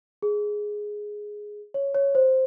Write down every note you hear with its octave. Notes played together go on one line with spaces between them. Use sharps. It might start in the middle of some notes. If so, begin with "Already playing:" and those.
G#4
C#5
C#5
C5